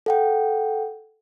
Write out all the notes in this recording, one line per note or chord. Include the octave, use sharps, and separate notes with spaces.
A4 F#5 G5